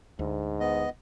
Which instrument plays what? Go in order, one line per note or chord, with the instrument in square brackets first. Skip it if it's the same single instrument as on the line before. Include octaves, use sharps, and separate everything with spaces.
[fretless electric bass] D2 [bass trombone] G#2
[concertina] B3 D#5